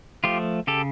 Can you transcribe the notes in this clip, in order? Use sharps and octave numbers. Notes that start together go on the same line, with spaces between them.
F3 A3 F4 G4
C#3 G4 A4